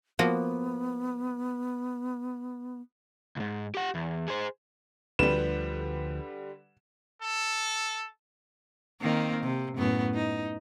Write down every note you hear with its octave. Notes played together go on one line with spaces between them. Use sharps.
F3 A#3 B3 F#4
C#2 G#2
G4 F#5
E2
G#4 C5
D2 D3 F3 G3 B4 E7
A4
D#3 A#3 C4
C3
F#2 A2 B3
D#4